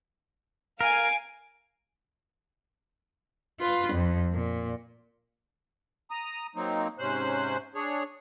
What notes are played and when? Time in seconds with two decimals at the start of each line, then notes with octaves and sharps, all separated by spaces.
0.81 A#4 F5 G#5 D7
3.60 F4 B4
3.93 F2
4.33 A#2
6.11 A#5 D#6
6.55 F#3 A#3 C4 D#4
6.99 G#2 C3 C#4 C5 F#6
7.75 D4 G#4 C#5